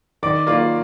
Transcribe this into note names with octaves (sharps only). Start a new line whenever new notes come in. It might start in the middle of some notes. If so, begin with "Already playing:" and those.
D#3 D5 D6
A#3 F4 D5 D6